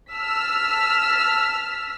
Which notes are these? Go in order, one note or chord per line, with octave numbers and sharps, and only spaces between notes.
A5 E6 F6 B6